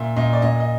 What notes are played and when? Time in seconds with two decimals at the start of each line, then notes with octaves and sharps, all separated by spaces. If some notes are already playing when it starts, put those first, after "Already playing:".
Already playing: A#2 E5
0.16 A#2 D#5
0.33 D5
0.42 A#2 D#5
0.60 D#5